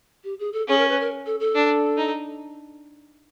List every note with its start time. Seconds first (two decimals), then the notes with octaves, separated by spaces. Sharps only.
0.24 G4
0.39 G#4
0.53 A4
0.68 C#4 G#4
0.78 A#4
0.89 B4
1.00 A#4
1.26 A4
1.40 A4
1.55 D4
1.98 D#4